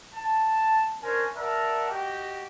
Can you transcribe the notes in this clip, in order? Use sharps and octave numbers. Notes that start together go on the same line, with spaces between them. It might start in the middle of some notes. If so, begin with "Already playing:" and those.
A5
C#4 D4 A#4 C5 G#5
A#4 D5 E5 F#5 A5
F#4 G4 D#5 G5